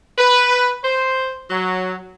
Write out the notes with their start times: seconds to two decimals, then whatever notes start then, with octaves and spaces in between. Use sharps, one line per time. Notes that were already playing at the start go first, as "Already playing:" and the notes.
0.18 B4
0.84 C5
1.51 F#3